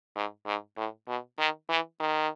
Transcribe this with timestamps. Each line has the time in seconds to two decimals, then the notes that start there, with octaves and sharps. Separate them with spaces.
0.16 G#2
0.46 G#2
0.77 A2
1.08 B2
1.39 D#3
1.69 E3
2.00 D#3